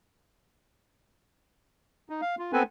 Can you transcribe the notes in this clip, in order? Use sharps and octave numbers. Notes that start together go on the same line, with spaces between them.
D#4
F5
F4
B3 C4 A4 B4 G#5